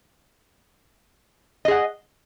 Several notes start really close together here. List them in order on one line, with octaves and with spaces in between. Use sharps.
D#5 G#4 F#5